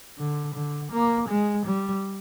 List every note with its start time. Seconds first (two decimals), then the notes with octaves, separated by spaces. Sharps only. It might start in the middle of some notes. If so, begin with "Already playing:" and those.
0.18 D3
0.55 D3
0.92 A#3
1.29 G#3
1.66 G3